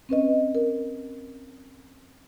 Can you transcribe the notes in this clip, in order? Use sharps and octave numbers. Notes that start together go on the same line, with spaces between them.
C4 C#4 B4 D#5
A#4